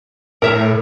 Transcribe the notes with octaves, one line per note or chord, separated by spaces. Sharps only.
A2 A#4 E5 A#5